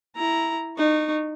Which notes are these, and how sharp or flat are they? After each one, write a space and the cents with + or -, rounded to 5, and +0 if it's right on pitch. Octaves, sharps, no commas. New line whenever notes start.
E4 +0 A#5 +0
D#4 -25 C#6 +0